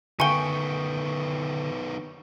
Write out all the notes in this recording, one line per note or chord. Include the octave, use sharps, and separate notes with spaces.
D3 D#3 B3 G5 G#5 C#6 G7